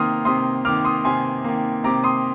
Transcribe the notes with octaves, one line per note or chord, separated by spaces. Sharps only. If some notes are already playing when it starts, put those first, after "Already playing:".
Already playing: C3 D#3 A#3 C6 D#6 F6
C3 C6 D#6
D#3 A#3 D6 F6
C6 D#6
C3 G#5 C6
D#3 A#3
C3 A#5 D6
C6 D#6